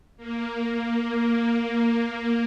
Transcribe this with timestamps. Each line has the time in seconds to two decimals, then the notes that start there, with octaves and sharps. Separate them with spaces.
0.17 A#3
1.17 A#3
1.50 A#3